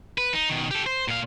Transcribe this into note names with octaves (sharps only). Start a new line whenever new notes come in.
B4
D#4
B2 D#3
G4 A4
C5
A#2 F5